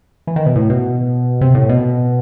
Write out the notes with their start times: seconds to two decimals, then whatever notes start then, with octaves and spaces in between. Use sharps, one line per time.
0.27 E3
0.36 D#3
0.46 B2
0.56 A2
0.70 B2
1.41 C3
1.55 A2
1.69 B2